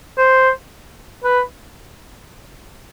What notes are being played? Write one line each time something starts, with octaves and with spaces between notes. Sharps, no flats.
C5
B4